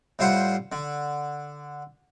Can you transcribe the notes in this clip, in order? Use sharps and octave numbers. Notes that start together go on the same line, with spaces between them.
A2 G3 F4 C5 F#5
D3